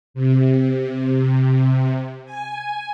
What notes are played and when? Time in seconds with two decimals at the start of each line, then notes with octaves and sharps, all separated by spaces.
0.14 C3
2.25 G#5